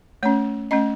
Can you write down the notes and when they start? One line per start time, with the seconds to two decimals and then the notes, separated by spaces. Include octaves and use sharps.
0.23 A3 C#4 C#5
0.71 A3 C#4 D#5